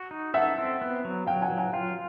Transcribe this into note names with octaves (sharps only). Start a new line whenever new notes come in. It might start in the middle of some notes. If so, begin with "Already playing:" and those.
Already playing: F#4
D#4
A4 E5 F#5
C4
B3
F#3
F#3 F5 G5
F#5 G#5
F#3
F#5 G#5
F4 F5 G5